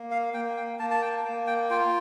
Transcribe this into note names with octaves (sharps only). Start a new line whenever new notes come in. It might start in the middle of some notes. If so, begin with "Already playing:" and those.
Already playing: A#3
F5
A#3 G5
G5
A#3 A5
A5
G5
A#3
G5
F4 G5